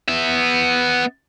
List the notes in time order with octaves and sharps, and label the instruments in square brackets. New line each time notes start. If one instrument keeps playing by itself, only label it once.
[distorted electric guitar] B3 E5